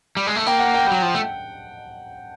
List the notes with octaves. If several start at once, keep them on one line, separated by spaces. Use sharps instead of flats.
G3
G#3
A3
A#3 G5
F#5
G5
G3
F#3
F3
A3